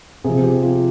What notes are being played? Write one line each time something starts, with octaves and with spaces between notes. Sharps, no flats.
C3 F3 G#4
G4
F4